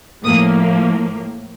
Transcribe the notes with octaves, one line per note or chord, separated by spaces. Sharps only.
A2 F3 A#3 D#6